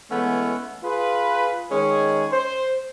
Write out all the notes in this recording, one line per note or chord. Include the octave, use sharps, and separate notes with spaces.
E3 G#3 A3 B3 C#4 E4
F4 G#4 B4
D#3 G#3 C#4 G#4
C5